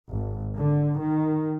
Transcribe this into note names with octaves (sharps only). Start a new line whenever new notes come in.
G#1
D3
D#3